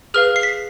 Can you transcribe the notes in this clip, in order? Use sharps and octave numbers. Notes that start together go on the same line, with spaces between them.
G#4 B4 F5 F6
C7
B6